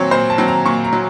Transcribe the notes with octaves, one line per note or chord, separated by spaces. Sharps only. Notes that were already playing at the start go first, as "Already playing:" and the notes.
Already playing: A#2 F#3 C4 C#5
A#2 C5
A5
F#3 C4
A#5
A#2 C#6
A#5
F#3